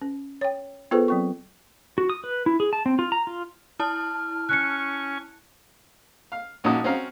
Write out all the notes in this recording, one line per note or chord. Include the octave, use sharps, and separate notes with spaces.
C#4
C#5 G5
B3 F4 G#4 A4 B4 C5
F#3 C4 C#6
F#4
D#6
B4
E4
G#4
A5
C4
F4
A#5
F4
E4 A5 F6
C#4 C#6 F#6 C#7
F5
A#1 C#4 D#4 F#4 A5 D#6
C4 C#4 F#4 F5 A#5 F6